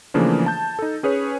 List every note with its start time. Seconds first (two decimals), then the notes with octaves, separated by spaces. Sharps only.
0.14 C#3 E3 F3 A3 A#3 D4
0.46 A5 G6
0.79 D#4 A4
1.03 C#4 G#4 B4 C#5